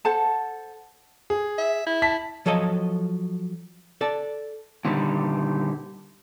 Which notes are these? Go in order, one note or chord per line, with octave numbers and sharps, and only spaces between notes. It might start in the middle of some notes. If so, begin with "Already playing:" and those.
A4 C5 F#5 A5
G#4
E5
E4
A5 B6
F3 F#3 A4 C#5 D#5
A4 D5 A5
A#2 D3 D#3 G3